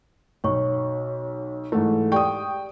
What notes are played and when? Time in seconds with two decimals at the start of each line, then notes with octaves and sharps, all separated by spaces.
0.44 B1 C#5 C#6
1.72 G#2 E3 A3
2.12 G4 D5 G5 C#6 D#6